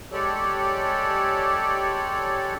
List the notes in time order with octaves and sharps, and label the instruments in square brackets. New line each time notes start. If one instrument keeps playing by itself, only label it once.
[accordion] G#3 G4 A4 C#5 D5